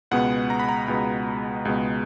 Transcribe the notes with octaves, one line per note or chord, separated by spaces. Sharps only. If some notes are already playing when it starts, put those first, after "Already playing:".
C#2 B2 G#3 B3 F#5
A#5
B5
A#5
C#2 B2 G#3 B3
C#2 B2 G#3 B3